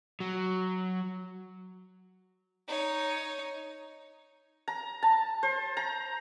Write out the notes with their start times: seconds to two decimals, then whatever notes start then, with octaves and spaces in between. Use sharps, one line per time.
0.20 F#3
2.68 D#4 C#5
4.68 A#5
5.03 A5
5.43 C5
5.77 A#5